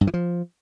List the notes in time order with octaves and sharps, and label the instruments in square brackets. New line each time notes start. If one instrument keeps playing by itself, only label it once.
[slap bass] G2
E3
F3